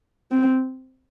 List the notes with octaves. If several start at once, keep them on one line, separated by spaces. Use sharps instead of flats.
C4